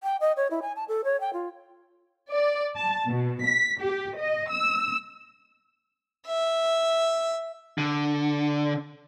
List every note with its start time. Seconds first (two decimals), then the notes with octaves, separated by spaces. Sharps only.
0.03 G5
0.21 D#5
0.37 C#5
0.51 E4
0.62 G#5
0.76 A5
0.88 A4
1.05 C#5
1.21 G5
1.33 F4
2.31 D5
2.76 A5
3.06 B2
3.46 B6
3.81 G4
4.18 D#5
4.51 E6
6.27 E5
7.78 D3